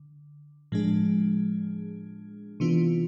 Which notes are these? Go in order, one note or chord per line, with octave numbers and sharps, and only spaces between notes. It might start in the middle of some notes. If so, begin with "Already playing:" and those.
Already playing: D3
A2 F3 G#3 D4 G#4
C3 E3 B3 D4 F4